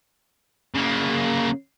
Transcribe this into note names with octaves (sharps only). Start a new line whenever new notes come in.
C#3 A#3